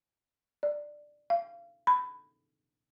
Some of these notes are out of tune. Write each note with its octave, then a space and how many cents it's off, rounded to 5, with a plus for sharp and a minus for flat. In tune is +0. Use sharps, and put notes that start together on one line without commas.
D5 +10
F5 -30
B5 +15